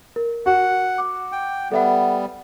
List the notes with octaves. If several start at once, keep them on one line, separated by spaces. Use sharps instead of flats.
A#4
F#4 F#5
D6
G5
G3 B3 A4 E5 F#5